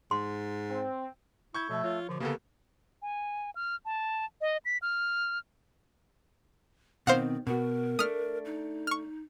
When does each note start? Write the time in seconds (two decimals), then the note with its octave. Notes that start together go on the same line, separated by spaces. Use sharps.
0.11 G#2 C6
0.70 C4
1.54 E4 C#6 G6 G#6
1.70 B2 F3 A3 A4
1.84 F4 C#5
2.09 B2 D3 F3 D6
2.20 C#3 A#3 B3 G4 A4 A#4 F#5
3.02 G#5
3.56 F6
3.85 A5
4.41 D#5
4.65 B6
4.82 F6
7.07 B2 D#3 C4 C5 F5 F#5
7.47 B2 F#4 A#4
7.99 A3 D4 D#6 F6
8.45 D#4
8.87 C#6 F6